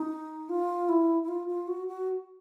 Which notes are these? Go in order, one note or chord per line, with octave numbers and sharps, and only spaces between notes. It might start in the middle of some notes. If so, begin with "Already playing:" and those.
Already playing: D#4
F4
E4
E4
F4
F4
F#4
F#4